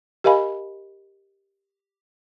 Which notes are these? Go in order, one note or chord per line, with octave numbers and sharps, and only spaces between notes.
G4 A#4 D#5 F5 G#5 B5